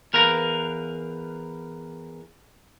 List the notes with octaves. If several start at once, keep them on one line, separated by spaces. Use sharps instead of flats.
E2 A#4 B4 F5 A#5